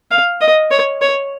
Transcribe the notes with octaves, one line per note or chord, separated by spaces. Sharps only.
F5
D#5
C#5
C#5